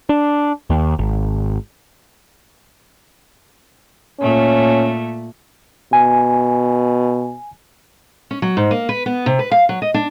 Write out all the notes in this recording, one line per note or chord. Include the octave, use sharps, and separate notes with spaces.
D4
D#2
G#1
A#2 A3 C#4
B2 G#5
C#4
F#3
G#2
A#3
B4
B3
C3
B4
F5
F#3
D#5
D4